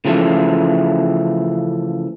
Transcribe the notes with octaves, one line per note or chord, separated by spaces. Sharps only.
C#3 E3 F3 A3